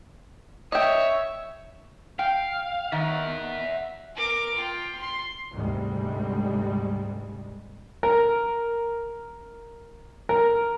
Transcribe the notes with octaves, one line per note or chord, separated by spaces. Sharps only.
C#5 D#5 E5 G5
F5 G5
D#3 E5 F#5
A#4 D6
F4 G5
C6
D2 G#2 C3 G3 G#3
A#4
A#4